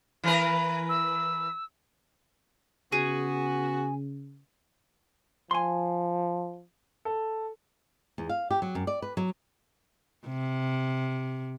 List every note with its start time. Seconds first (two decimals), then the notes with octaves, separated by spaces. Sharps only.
0.24 E3 A#4 B4
0.89 E6
2.92 C#3 B3 F#4 G#4
5.51 F3 G#5 C6
7.05 A4
8.18 E2
8.29 F5
8.51 G4
8.62 F#3
8.75 F#2
8.87 D5
9.02 B4
9.17 F#3
10.27 C3